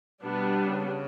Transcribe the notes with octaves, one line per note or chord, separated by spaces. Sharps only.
B2 G3 B3 D4
C#3